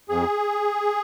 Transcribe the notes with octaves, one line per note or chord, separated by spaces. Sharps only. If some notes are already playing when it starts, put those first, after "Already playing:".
F2 G#4